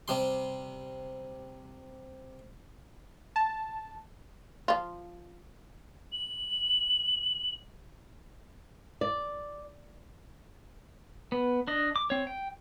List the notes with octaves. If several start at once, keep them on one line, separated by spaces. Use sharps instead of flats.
C3 G3 C6
A5
F3 F4
F#7
D5
B3
D4 D#5
D6
C4 C#5
G5